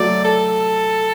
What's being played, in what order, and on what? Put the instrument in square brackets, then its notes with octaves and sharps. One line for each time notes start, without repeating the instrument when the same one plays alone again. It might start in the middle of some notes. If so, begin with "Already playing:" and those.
Already playing: [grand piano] F#3 A3 [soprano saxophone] D5
[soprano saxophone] A4